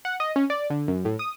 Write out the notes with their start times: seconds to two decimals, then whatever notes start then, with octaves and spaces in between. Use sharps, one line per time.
0.05 F#5
0.20 D#5
0.36 C#4
0.50 D5
0.70 D3
0.88 F#2
1.05 A2
1.19 D#6